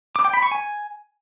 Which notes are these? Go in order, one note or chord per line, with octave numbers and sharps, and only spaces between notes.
D6
G5
B5
C#6
G#5